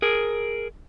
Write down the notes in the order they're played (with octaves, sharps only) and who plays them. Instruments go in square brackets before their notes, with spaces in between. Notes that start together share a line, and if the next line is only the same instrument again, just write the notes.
[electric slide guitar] G#4 A#4